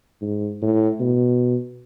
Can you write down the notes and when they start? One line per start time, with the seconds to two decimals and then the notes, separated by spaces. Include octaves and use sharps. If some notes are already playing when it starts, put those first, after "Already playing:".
0.22 G#2
0.62 A2
1.00 B2